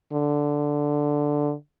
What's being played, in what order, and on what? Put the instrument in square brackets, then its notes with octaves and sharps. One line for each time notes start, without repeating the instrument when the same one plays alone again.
[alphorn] D3